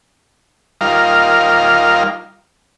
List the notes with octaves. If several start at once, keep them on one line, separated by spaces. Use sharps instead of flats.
G3 D#4 F4 A#4 F5